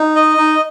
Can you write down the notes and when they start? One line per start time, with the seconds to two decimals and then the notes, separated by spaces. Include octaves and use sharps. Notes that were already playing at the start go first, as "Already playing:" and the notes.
Already playing: D#4
0.16 D#5
0.38 D#4